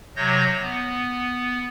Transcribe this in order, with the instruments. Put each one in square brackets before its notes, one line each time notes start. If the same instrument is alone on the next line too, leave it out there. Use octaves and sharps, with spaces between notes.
[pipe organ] C3 F#3 C#5 G6 A#6
B3